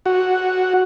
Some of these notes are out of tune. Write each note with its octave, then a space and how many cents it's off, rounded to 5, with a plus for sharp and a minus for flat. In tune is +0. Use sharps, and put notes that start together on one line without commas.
F#4 +0